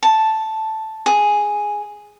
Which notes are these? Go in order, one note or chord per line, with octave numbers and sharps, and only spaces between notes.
A5
G#4